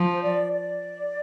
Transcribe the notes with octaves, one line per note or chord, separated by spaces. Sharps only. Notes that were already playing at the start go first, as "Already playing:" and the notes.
Already playing: F3
C5
D5
D5